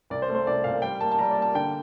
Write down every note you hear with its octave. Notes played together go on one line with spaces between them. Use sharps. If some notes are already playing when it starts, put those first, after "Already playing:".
C2 D5
C5
A3
C5
C2 D5
A#2 F5
G3 G5
A#3 A5
A5
G3 A#5
D5
A#3
A5
D3 G5